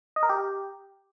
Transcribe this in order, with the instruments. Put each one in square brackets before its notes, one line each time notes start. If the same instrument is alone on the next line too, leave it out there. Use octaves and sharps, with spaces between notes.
[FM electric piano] D#5
A#4
G4